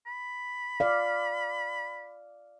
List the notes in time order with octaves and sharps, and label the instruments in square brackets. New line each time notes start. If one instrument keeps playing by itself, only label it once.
[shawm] B5
[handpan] D5 F5